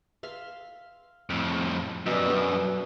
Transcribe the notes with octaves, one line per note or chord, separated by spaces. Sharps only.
E5 F5 C6
F2 A2
F#2 B2 G3
B3 D4 A4